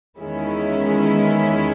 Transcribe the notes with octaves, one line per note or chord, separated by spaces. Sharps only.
E2 D#3 G#3 C#4 E4